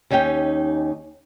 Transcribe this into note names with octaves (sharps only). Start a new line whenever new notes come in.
D#2 C#4 D#4 G4 G5